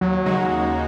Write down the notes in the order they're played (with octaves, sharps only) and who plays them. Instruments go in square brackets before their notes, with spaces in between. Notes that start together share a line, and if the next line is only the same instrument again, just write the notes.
[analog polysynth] D#2 [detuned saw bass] F#3
[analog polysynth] C#3 G#3 D#4 F#4
D#2